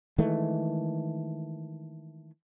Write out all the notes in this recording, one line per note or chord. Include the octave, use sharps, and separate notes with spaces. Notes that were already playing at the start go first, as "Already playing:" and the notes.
D#3 E3 G#3 A3